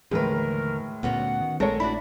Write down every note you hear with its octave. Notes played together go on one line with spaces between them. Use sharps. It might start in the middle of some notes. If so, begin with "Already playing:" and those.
D#2 A2 D3 E3 F3 G#3 A#4 B4
D2 A#2 A3 B3 C#4 F#4 F#5
D#3
A#1 G#3 A3 C4 A4 A#4 C#5
D4 E4 F#4 D5 B5